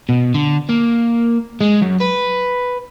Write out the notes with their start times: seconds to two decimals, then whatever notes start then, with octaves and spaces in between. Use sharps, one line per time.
0.09 B2
0.34 D3
0.69 A#3
1.61 G#3
1.82 F#2
2.00 B4